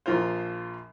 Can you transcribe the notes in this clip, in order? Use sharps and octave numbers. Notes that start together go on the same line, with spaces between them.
A#1 F3 F4 A#4 C5